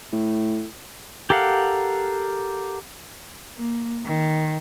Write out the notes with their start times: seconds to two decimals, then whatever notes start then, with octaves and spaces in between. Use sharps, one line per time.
0.13 A2
1.30 G4 A4 A#4 F5 F#5
3.57 A#3
4.05 D#3